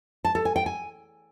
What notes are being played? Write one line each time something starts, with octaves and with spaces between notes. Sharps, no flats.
A5
A4
G#5
G5
G#5